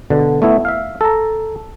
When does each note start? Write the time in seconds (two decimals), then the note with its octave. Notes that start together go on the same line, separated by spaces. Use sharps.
0.10 B2 D3
0.42 A3 B3 E4
0.65 E5 F5
1.01 A4 A#5